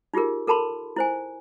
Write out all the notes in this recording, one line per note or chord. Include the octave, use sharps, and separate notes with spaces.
D#4 F4 G4 G#4 A#4
A4 A#4 A5 B5 C6
E4 C5 G#5